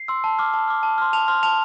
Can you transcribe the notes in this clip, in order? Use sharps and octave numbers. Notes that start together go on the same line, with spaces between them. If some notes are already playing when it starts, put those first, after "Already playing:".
Already playing: C7
C6 E6
A5
D6 F6
A5
D6 F6
A5
C6 F6
A5 F7
C6 F6
A5 F7